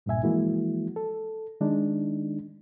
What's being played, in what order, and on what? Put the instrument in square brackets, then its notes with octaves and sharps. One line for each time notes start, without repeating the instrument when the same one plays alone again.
[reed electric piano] C2 G2 A#2 E5 G#5
E3 F3 G#3 A#3 E4 F#4
A4
D#3 G#3 D4 D#4